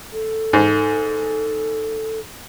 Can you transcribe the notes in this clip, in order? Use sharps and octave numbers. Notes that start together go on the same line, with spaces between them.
A4
G#2